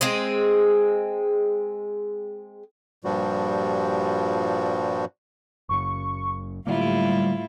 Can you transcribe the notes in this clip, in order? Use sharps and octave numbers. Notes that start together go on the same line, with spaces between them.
G#3 C4 G#4
G2 A#2 F3 G3 F#4
F#1 F#2 C#3 C#6
A2 D3 F#3 G3 A#3 E4 F4